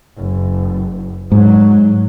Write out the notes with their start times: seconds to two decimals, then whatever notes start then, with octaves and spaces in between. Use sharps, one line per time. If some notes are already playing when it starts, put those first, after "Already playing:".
0.17 F#1
1.32 G#2 F#3